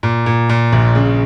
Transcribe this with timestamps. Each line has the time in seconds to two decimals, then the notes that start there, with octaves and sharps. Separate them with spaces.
0.03 A#2
0.26 A#2
0.49 A#2
0.73 A#1
0.95 C#3